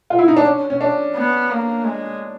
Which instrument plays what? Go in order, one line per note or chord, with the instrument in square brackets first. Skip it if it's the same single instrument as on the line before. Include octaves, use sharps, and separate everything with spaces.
[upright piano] F4
E4
D#4
D4
C#4
C#4
D4
[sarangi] B3
A#3
G#3